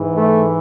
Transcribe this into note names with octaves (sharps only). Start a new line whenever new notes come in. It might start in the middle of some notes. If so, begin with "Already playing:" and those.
Already playing: G#2 E3
A3